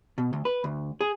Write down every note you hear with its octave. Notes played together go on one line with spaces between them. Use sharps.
B2
D2
B4
D2
G#4